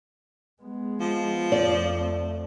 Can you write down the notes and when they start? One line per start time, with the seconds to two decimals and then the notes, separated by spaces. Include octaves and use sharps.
0.62 G#3 B3
1.00 F3
1.52 F2 A3 D5